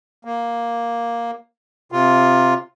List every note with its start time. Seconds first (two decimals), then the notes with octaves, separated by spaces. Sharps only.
0.25 A#3
1.92 C3 F4